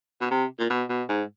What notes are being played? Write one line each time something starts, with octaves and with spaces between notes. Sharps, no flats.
B2
C3
A#2
B2
B2
G#2